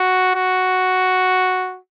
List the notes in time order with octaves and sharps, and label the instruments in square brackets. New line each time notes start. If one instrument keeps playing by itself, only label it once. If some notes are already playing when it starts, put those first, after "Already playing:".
Already playing: [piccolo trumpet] F#4
F#4